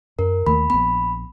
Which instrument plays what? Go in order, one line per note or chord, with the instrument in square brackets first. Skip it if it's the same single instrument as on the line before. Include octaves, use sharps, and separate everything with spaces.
[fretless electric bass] F#2 [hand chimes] A#4
[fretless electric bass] D#2 D#3 A3 [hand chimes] B5
[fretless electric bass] A#1 B3 [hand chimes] B5